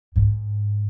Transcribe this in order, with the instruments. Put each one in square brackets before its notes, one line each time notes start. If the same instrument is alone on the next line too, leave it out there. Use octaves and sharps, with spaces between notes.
[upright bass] G#2